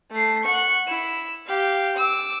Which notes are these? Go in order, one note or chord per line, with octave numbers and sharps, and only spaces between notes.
A3 C7
F#5 C#6
E4 E7
G4 F5
D6 E6